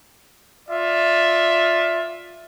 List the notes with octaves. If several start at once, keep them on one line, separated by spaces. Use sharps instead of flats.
F4 D5 E5